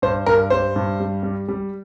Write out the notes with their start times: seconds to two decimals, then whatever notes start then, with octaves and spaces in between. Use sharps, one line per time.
0.02 G2 C5
0.26 G2 A#4
0.50 G3 C5
0.76 G2
1.00 G3
1.23 G3
1.48 G3